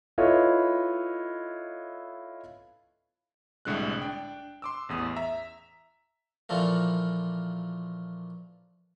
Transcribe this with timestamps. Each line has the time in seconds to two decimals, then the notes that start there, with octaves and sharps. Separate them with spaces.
0.18 E4 F4 A4 B4 C#5 D#5
3.65 C2 A2 D3 G#3 F#6
4.02 D4 G5
4.62 C6 D6 E6
4.89 A1 E2 D#6
5.16 E5 A#5
6.49 A#2 E3 F3 A3 A#3